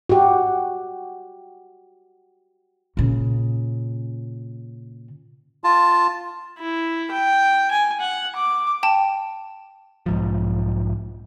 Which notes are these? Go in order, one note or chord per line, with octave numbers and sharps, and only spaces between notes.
F#4 G4
A#2 C#3
F4 A5
E4
G5
G#5
F#5
D6
G5 A5
B1 G#2 F3